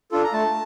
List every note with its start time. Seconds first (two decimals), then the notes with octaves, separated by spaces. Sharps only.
0.11 D4 F4 A4
0.24 A#5
0.33 A3 A5